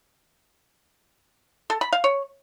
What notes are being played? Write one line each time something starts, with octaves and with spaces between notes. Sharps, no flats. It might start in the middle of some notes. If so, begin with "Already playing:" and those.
A4
B5
F5
C#5